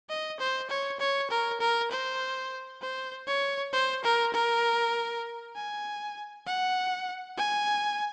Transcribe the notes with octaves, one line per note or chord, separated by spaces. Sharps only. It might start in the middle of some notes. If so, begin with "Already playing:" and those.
D#5
C5
C#5
C#5
A#4
A#4
C5
C5
C#5
C5
A#4
A#4
G#5
F#5
G#5